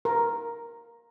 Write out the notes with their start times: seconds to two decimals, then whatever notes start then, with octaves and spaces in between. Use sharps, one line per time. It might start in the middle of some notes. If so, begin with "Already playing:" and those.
0.05 A#4